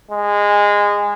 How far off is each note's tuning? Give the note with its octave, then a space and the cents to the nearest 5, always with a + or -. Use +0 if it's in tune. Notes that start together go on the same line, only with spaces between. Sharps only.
G#3 -20